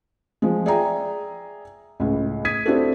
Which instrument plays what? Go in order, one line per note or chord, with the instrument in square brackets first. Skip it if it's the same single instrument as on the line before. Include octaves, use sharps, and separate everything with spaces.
[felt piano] F3 G#3
G#4 D5 E5 G5 G#5 A#5
C#2 A2
D#6 G#6 B6 D#7
C4 D4 E4 F#4 G4 A4